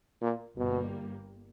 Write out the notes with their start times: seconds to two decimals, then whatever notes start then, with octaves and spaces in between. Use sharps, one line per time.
0.21 A#2
0.57 G1 G2 B2 G3 A#3